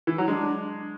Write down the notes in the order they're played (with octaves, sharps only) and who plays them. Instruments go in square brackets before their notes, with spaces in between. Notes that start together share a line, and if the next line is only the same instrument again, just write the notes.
[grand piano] E3
F#3
[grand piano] G#3 [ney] D4